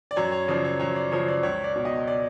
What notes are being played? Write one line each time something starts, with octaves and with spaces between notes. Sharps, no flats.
D5
F#2 C#5
C#5
C#3 F3 D5
C#5
F#2 C#5
D5
C#3 F3 C#5
D5
C#2 C#5
D5
B2
D#5
D5